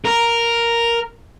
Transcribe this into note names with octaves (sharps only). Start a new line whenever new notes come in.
A#4